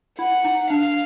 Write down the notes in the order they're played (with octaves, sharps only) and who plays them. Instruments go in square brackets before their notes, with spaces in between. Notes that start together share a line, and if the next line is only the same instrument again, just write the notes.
[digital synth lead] E4 [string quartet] F#5
[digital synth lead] D#4
[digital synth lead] D4 [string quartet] F5